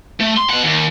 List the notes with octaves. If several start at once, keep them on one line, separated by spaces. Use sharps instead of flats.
A3
C6
B2 F#5
D#2